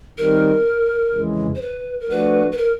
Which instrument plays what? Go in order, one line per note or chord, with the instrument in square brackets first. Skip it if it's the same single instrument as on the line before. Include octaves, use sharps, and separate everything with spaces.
[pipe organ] D#3 G3 C4 D#4 [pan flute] A#4
[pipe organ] F2 C#3 E3 G#3
[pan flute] C5
B4
A#4
[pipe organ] F3 A3 D4 F#4 [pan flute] B4
[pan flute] B4
A#4